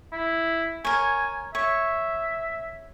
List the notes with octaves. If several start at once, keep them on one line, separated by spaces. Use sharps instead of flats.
E4
A#4 C#5 G#5
C#5 E5